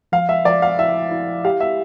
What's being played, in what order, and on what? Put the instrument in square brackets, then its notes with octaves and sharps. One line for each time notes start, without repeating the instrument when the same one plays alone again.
[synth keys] F3 [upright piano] F5
[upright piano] E5
[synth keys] F3 [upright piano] D5
[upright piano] F5
[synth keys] E4 [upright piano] E5
[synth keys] E4
[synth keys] G4 [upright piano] F5
[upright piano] E5